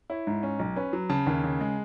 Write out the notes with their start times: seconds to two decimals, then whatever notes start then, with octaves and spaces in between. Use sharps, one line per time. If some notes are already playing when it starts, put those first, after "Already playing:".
0.10 E4 C#5
0.27 G#2
0.43 C#4
0.59 B1
0.76 C#4 B4
0.93 F#3
1.10 C#3 A5
1.27 D#2
1.44 C#3
1.61 G#3